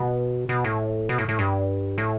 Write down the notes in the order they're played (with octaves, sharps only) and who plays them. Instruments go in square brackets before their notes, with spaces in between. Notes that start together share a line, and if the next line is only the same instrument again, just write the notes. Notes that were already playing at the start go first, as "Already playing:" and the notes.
Already playing: [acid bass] B2
B2
A2
B2
A2
A2
G2
A2